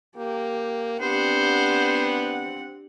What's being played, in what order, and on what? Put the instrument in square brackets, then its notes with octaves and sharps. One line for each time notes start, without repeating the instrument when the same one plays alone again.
[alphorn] A#3 [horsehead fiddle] G4
[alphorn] B3 [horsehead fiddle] C4 F#5 [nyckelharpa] D4 G4 [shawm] C5